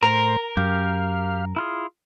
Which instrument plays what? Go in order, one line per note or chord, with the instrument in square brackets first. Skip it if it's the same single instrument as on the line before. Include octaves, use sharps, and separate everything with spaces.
[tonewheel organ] A2 C5 [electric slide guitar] A#4 [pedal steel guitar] A#5
[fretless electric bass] F#2 [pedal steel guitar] G4 [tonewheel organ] F5
[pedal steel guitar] E4 F4 G#4